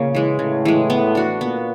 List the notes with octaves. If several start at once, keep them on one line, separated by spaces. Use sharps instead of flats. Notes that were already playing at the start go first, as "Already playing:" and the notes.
Already playing: A#2 C#3 A#3 C#4
E3 G#3
A2 C#3 A3
E3 G#3
B3
D4 F#4
A#2 A#3 B3